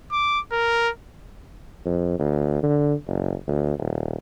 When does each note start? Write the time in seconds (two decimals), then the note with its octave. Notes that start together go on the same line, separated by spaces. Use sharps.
0.12 D6
0.52 A#4
1.85 F2
2.19 D2
2.63 D3
3.08 F#1
3.47 D2
3.78 D#1